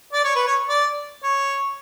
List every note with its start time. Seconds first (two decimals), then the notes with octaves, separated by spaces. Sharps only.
0.13 D5
0.24 C#5
0.35 B4
0.47 C#5
0.69 D5
1.23 C#5